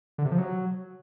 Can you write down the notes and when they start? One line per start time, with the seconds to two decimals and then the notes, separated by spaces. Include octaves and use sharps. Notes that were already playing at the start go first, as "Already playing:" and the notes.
0.18 D3
0.25 C3
0.32 F3
0.38 F#3